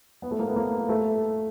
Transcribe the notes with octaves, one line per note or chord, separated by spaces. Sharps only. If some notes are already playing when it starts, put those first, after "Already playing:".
B3
A3
A#3
B3
A#3
A3